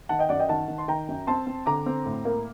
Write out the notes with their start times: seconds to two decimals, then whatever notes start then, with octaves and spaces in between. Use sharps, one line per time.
0.09 D#3 F#5 A5
0.19 D#5 G5
0.29 F#2 D5 F#5
0.40 D#5 G5
0.48 D#3 F#5 A5
0.68 D#3
0.78 C6
0.88 D#3 G5 A#5
1.08 F#2
1.27 C4 A5 C6
1.47 C4
1.66 D3 A#5 D6
1.86 C4
2.05 A2
2.25 A#3